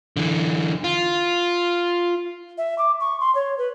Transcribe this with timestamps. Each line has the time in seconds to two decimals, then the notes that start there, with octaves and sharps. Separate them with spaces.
0.17 D3 E3
0.84 F4
2.58 E5
2.78 D6
3.00 C#6
3.20 C6
3.35 C#5
3.58 B4